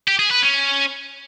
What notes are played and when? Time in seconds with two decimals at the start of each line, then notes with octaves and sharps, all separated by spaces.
0.08 G4
0.19 G#4
0.31 B4
0.42 C#4